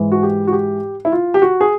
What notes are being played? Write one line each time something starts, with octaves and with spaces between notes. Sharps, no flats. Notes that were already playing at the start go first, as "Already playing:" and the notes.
Already playing: G#2 E3 G#3
F#4
G4
F#4
G4
E4
F4
G4
F#4
G#4